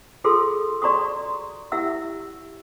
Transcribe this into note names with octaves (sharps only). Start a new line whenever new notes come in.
F4 G#4 A4 C6 E6
F#4 D5 A#5 C6 C#6 D#6
E4 G4 E5 F#5 E6